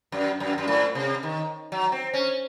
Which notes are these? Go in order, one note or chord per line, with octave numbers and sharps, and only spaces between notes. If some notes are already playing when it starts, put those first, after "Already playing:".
F#2
F#2
F#2
A2
C3
D#3
F#3
C4
C#4